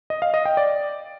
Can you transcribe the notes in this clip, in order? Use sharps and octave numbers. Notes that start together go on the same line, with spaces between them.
D#5
F5
D#5
G5
D5